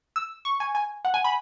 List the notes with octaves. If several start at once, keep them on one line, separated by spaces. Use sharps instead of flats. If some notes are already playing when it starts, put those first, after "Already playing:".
E6
C#6
G#5
G#5
F#5
G#5
B5